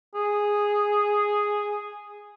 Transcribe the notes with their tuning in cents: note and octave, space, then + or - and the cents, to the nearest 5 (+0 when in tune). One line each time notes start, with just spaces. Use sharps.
G#4 -5